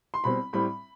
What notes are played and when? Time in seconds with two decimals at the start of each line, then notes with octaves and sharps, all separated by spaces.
0.14 C6
0.24 B2 G3 C4 B5
0.53 A2 G3 C4 B5